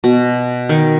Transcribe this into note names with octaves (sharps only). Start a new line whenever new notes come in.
B2
D#3